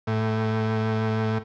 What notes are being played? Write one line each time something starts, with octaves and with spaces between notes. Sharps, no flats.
A2